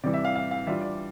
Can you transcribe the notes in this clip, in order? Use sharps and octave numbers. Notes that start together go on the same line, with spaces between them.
C3 E3 G3 D5
E5
F5
F5
F5
E3 G3 D4 F4 E5
D5